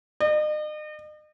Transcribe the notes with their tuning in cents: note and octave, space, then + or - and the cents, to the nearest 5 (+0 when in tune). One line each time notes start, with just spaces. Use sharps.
D#5 -40